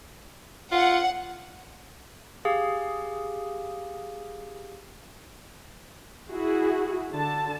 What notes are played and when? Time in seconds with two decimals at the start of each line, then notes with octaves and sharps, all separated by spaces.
0.72 F4 F#5
2.45 G4 G#4 F5
6.31 E4 F#4 G#4
7.11 D3 A5